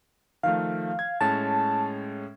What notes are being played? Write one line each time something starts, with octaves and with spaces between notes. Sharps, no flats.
D#3 F3 A3 F5
G#6
A2 G#3 C#4 A5